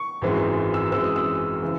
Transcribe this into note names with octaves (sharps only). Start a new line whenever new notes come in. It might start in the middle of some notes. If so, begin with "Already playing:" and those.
Already playing: C#6
G#1 F#2 E3 G#3 C4
E6
F#2 E3 G#3 C4 E6
D#6
E6
C#3 E3